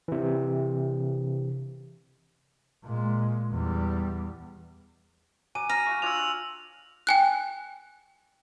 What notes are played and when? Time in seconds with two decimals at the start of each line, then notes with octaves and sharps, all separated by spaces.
0.08 C3 E3
2.84 A#2 G#3
3.51 E2 G3
5.55 F#3 F#5 G#5 D6 D#7
5.69 A#5 F6
5.86 F#4 F5 C#6
6.02 D4 F4 C#5 E6 F7
7.07 G5 G#5 F#6